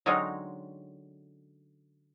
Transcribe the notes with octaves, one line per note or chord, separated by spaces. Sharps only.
D3 F#3 G#3 C4 C#4 D#4